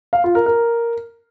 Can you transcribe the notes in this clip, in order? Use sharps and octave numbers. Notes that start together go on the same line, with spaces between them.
F5
F4
A#4
A#4